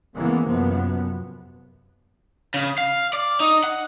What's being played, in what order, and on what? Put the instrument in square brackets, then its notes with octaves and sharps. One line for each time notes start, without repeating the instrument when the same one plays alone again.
[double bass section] C#3 E3 G#3 A#3 B3
F#2 C3 F3 B3
[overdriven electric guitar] C#3
F5
D5
D#4
F#5